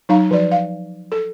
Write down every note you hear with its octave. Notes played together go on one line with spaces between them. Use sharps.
F#3 D#4 F5 A#5
F3 D5
F5
A4